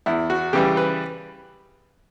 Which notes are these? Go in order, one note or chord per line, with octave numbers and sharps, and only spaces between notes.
E2 E4
F#4
C#3 E3 G3 G4
B4